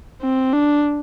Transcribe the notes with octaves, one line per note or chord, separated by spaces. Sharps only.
C4
D4